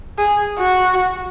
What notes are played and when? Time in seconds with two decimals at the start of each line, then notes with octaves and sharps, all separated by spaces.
0.18 G#4
0.59 F#4